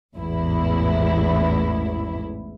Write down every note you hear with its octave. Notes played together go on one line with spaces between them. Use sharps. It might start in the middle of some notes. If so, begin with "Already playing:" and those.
A1 E2 G#2 E4